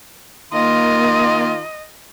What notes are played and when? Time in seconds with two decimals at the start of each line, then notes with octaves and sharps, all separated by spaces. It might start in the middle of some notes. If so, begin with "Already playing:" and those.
0.53 D#3 A#3 F4 D#5 C6